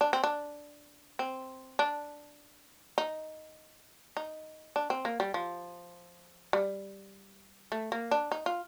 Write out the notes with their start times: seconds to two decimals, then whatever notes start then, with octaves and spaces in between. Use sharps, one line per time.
0.01 D4
0.13 C4
0.24 D4
1.19 C4
1.79 D4
2.98 D#4
4.17 D#4
4.76 D4
4.90 C4
5.05 A#3
5.20 G3
5.34 F3
6.53 G3
7.72 A3
7.92 A#3
8.11 D4
8.32 D#4
8.46 F4